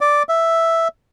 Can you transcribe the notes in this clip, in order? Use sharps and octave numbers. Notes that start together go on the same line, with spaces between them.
D5
E5